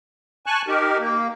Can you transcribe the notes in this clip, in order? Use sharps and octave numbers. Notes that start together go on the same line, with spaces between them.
G#5 A5 C#6 F#6
D#4 G4 A#4
A#3